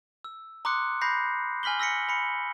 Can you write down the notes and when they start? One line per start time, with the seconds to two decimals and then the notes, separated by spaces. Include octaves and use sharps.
0.24 E6
0.65 A#5 C6 D6 D#6 F#6 C#7
1.01 B5 G6 A#6 C7
1.63 G#5 F6 B6 F#7 G7
1.80 E6 A#6 B6 C#7
2.09 B5 C#7